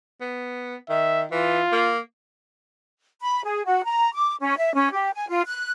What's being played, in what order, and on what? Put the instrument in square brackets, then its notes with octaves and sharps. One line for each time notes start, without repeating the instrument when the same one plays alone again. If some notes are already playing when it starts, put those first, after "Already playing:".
[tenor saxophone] B3
[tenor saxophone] D#3 [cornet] E5
[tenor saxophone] E3 [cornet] F4
[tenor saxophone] A#3
[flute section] B5
G#4
F#4
A#5
D6
C#4
E5
C#4
G4
G#5
F4
F#6